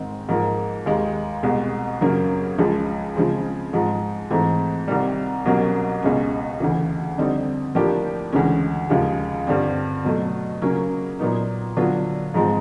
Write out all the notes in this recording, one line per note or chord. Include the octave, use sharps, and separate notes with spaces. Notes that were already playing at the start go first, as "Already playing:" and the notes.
Already playing: G#2 D#3 G#3 C4
G#2 F3 A#3
D#2 D#3 G#3
C2 B2 G#3
F#2 C#3 F#3 A#3
C#2 C#3 F3 G#3
C#3 F3 G#3 C4
G#2 F3 G#3
G#2 E3 A3 C4
C2 C3 D#3 G3
C2 B2 F#3 A#3 C#4
C#2 B2 G#3 C#4
D2 C#3 E3
F2 D3 G3 C4 D#4
A2 F3 A#3 D4 G4
D2 C#3 E3 G#3 C#4
D#2 C#3 F3 G#3
G2 D3 G3 C4
B2 F#3 A3
C#3 F#3 A#3 C#4
A#2 F#3 B3 D#4
D3 F#3 B3 D4 F4
G#2 F3 G#3 C4